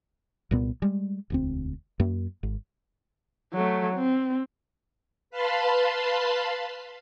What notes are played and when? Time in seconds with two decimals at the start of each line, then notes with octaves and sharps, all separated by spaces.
0.51 C2 A#2 B3
0.82 G3 G#3
1.30 E1 D2 C4
2.00 F#2 A#3
2.43 G#1
3.53 F#3 A3
3.95 C4
5.30 B4 F5 A5 B5 C6